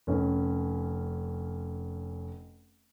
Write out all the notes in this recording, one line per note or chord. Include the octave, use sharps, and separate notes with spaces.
F1 C#4